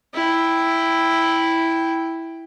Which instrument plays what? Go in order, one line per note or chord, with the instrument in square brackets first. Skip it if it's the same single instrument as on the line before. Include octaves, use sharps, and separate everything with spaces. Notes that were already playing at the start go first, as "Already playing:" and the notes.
[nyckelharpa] E4 G5